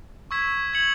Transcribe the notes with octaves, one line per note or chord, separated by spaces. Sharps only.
C#6 E6 G#6 B6 E7
G#6 C#7 F#7